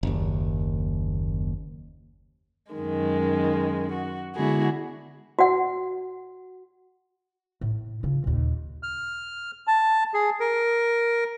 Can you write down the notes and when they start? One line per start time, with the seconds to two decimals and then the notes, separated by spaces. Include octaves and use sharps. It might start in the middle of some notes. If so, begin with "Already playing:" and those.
0.03 F#1 D#2
2.72 F#2 D#3 G#3
3.92 F#4
4.35 D3 G#3 B3 E4 F#4 G#4
5.39 F#4 F#5
7.61 A2
8.03 C#3 F4
8.24 D#2 A#2
8.83 F6
9.67 A5
10.14 G#4
10.40 A#4